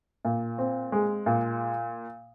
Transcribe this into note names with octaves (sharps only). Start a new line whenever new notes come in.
A#2
C4
G#3
A#2